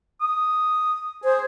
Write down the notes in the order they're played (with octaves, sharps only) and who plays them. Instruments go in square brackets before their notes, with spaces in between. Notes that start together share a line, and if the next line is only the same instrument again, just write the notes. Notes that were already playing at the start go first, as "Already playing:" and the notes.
[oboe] D#6
[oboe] G#4 [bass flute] C5